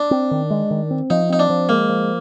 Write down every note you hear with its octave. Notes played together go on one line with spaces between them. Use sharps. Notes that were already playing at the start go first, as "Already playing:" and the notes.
Already playing: D4
C4
D#3
G#3
D#3
C4
F3 D#4
C4 D#4
D4
F3
G#3 A#3
F3